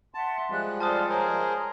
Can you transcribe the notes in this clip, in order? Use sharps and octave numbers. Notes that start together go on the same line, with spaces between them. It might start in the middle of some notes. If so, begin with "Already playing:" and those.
E5 F#5 A5 C6
F3 G3 G#3 F#6
F4 A4 C5 D5 A5 D#6
G#4 A#4 C5 C#5